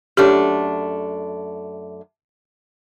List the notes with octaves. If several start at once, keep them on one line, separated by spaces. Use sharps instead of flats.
F#2 A3 D4 G4 A4 C#5